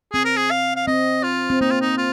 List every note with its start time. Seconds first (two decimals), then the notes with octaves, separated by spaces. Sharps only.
0.13 C4 G#4
0.25 A#4
0.36 G#4
0.51 F5
0.76 F5
0.87 C4 D#5
1.24 F4
1.50 C4
1.61 A#3 D#4
1.71 F4
1.81 D#4
1.98 F4